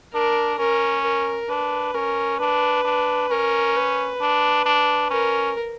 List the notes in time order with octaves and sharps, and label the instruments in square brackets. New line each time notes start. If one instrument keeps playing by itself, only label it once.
[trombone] D4 [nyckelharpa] A#4
[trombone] C#4 [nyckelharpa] A#4
[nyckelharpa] A#4
[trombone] D4 [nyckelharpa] B4
[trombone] C#4 [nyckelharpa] A#4
[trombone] D4 [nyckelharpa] B4
[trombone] D4
[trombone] C#4 [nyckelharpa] A#4
[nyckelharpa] B4
[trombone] D4
D4
[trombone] C#4 [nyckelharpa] A#4